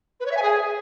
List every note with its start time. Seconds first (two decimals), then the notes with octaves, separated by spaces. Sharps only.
0.20 B4
0.25 C#5
0.31 E5
0.36 G#5
0.42 G#4